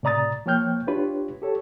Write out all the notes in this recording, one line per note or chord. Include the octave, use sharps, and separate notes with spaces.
A2 C3 D5 A#5 D#6 A6
F3 A#3 C#5 G5 F6 G6
D4 F4 G4 B4 C#5
G4 A4 C#5